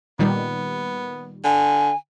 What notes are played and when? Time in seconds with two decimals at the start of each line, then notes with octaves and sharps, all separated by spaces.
0.19 A#2 D#3 G3 B3
1.44 D3 G#5